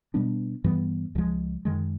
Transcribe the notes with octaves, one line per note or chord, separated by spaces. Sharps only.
B2 G3 B3 D4
G2 E3 G3 B3
C#2 C#3 F3 G#3
F#2 D#3 G#3